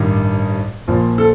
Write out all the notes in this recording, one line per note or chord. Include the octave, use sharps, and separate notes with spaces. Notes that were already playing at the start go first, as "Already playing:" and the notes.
Already playing: A1 G2 D#3
A#1 A#2 F3
A4